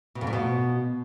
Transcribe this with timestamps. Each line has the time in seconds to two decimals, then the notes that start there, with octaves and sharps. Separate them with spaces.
0.15 B2
0.21 F2
0.27 A#2
0.33 B2